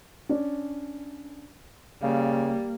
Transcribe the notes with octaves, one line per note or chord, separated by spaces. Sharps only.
C#4 D4 D5
C#3 G3 A#3 F5